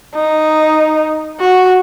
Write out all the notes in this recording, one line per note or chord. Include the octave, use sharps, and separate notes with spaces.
D#4
F#4